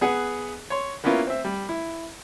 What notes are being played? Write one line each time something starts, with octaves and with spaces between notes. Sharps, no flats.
B3 G#4 F#5
C#5 C6
A#3 B3 C#4 E4 F4
C4 E5
G3
E4